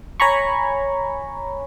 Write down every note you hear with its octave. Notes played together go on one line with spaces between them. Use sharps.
C#5 G#5 A#5 B5 C#6